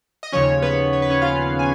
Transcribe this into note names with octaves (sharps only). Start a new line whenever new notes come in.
D#5
D#2 C#3 F3 C#4 C#5
B3 B4
C#5
B4
C#4 C#5
F4 F5
G#5